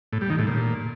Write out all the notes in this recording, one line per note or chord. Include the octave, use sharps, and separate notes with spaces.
A2
G3
D#3
A2
A#2